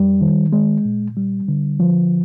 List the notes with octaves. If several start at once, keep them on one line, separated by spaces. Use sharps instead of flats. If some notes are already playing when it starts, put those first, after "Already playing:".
Already playing: F2 G3
D#3
G#3
A#2
G3
D3
F3